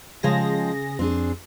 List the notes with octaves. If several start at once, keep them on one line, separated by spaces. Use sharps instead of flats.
C#3 F3 G#3 G4 G#4 A#6
F2 C4 D4 G#4